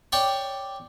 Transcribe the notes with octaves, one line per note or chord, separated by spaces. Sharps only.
C#5 D5 G5 C#6